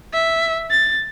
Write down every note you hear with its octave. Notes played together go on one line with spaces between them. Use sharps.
E5
A6